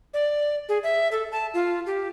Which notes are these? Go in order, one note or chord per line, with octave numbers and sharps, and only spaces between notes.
D5
G#4
E5
A4
A5
F4
G4